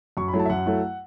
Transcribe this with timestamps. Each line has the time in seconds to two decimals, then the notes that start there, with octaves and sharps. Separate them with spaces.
0.17 F#2 C#6
0.28 B5
0.34 F#3 A3 E4
0.39 A5
0.46 E5
0.50 F#2 F#5
0.66 F#3 A3 E4